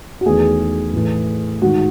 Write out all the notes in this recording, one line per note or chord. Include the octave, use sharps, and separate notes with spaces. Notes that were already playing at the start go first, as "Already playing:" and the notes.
F#4
E2 D#3 A3 G#4
A2 E3 A3
G#2 D#3 G#3 F#4